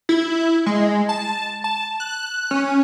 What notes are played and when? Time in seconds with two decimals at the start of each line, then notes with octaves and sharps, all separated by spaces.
0.09 E4
0.66 G#3
1.09 A5
1.64 A5
2.00 F#6
2.51 C#4